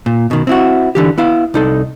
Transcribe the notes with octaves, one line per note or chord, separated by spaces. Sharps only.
A#2
B2 D#3
C4 E4 F#4
D3 E3 G4
B3 E4 F5
C2 D#4 A4